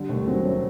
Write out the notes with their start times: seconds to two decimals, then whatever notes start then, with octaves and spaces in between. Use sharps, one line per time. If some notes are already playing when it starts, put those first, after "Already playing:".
Already playing: D3 G3
0.09 D#2 A3
0.27 F#3 C4
0.44 A3 C#4